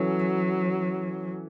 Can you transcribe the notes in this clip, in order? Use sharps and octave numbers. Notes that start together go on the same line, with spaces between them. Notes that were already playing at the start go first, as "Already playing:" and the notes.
Already playing: E3 F#3 C#4 A4 C#5